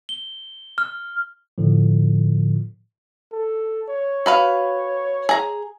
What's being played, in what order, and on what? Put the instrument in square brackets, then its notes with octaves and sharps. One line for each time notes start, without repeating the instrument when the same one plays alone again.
[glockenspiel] G7
F6
[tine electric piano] A2 D3 F3
[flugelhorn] A4
C#5
[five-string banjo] F#4 B4 F5
G#4 A#5